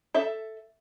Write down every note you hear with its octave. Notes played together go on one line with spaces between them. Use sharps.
A4 E5